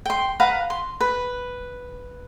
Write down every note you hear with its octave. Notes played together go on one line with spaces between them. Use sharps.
G5 C6
B4 F5 F#5 A#5
C6
B4